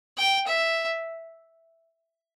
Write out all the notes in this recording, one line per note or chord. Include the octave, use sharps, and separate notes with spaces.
G5
E5